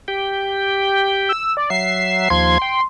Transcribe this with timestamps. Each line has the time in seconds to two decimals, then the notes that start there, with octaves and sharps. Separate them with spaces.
0.08 G4 G5
1.29 E6
1.57 D5
1.70 F#3 E5 C7
2.30 D#2 F3 C6 G#6
2.62 G5